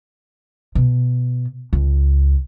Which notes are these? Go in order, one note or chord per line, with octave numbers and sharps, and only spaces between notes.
B2
C#2